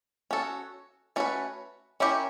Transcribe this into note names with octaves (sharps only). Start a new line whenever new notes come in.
C#4 F#4 A4
A3 C#4 F#4 B4
C#4 E4 G4 A#4 C#5